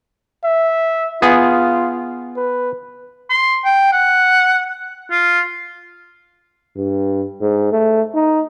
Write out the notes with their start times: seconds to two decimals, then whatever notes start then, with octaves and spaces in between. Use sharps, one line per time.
0.44 E5
1.22 B3 F4 G#4
2.36 B4
3.30 C6
3.65 G5
3.92 F#5
5.11 F4
6.77 G2
7.41 G#2
7.72 A3
8.14 D#4